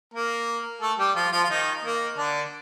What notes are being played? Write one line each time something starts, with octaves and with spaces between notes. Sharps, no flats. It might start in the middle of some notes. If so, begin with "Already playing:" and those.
A#3 A#4
A3 A4
G3 G4
F3 F4
F3 F4
F4
D#3 D#4
A#3
D3 D4